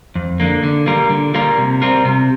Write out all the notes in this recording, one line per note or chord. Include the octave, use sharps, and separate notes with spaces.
F2
D3 A#3
D3
G3 A#3 F4 A#4
D3
G3 A#3 F4 A#4
C3
G3 C4 F4 A#4
C3